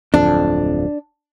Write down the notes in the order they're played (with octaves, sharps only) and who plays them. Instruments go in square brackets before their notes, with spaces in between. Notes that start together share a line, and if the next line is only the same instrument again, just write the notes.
[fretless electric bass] D1 F2 [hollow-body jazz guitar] D4